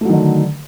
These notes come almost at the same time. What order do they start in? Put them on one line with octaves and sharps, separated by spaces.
A3 F#3 D#3 D3